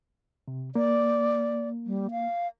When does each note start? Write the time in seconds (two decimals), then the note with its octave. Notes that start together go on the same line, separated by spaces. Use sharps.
0.48 C3
0.75 A#3 D5
1.87 G3
2.11 F5